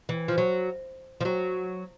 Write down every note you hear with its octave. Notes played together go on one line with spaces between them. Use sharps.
E3
F3
F#3
F3
F#3